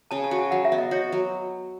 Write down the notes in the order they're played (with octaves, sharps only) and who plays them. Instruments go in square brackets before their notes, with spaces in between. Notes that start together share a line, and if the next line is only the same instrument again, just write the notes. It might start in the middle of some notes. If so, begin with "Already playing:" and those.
[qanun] C#3 [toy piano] A5
[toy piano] A5
[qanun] F#4
[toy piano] G#5
[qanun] F#3 [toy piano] F#5
[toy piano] E5
[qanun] B3
[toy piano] D#5
[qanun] F#4 [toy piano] C#5
[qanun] F#3